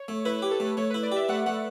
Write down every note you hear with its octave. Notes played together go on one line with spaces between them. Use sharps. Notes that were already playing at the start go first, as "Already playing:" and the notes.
Already playing: C#5
A3
E4 B4
B4
G4
A4
A3 B4
A3 C#5
B4
E4
D5
G4 E5
A3 F#5
A3 F#5